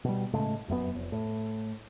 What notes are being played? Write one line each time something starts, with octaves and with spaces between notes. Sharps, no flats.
B2 G3
A2 C#3 G#3 A3
F1 F#2 A2 B3
F1
A2